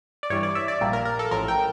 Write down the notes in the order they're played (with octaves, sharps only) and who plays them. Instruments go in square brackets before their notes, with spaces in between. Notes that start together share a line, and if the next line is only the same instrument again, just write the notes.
[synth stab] D5
G2 E3 G3 C#5
D5
E5
D5
A#1 A#2 G3 A#3
A#4
A#4
A4
A1 A2 F3 A#4
G5